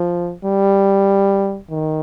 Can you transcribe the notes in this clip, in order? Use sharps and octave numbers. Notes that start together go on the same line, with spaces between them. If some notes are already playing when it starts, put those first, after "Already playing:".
Already playing: F3
G3
D#3